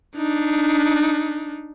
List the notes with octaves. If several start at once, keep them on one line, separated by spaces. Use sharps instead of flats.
D4 D#4